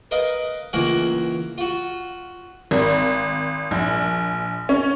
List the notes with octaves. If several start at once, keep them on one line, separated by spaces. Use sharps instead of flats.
A#4 B4 D#5 F5
C#2 E3 A#3 F#4 A#4
F4 F#4
G#1
A#1
C#4